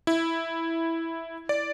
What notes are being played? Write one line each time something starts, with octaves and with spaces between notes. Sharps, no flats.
E4
D5